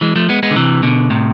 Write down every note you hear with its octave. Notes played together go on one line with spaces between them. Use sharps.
E3 G#3
F3 A3
G#3 B3
G#3 B3
D3
C3 E3
B2 D3
A2 C3